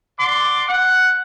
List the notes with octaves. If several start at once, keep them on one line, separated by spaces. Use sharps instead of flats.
D5 F#5 C6 D6
F#5